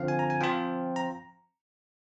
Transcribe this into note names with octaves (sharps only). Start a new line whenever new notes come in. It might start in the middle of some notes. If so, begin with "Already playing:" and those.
Already playing: D3 F3 C4 F5
G#5
A#5
G#5
F3 C4 F4 G5
A#5